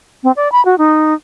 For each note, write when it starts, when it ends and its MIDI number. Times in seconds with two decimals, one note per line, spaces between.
0.23 0.32 60
0.36 0.51 74
0.52 0.64 83
0.65 0.78 66
0.78 1.14 63